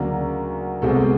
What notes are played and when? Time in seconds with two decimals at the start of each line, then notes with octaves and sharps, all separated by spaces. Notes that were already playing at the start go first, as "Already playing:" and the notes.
Already playing: D2 C#3 F#3 A#3 D5
0.82 C2 B2 G#3 C4 A4